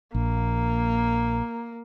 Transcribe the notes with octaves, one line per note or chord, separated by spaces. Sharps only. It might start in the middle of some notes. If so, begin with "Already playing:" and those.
A#1 A#3